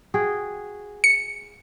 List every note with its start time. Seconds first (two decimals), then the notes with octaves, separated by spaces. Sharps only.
0.14 F#4 G#4 G5
1.04 C#7